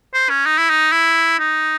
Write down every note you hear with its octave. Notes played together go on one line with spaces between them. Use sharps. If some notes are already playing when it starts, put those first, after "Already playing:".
C5
C#4
D#4
E4
D#4
E4
D#4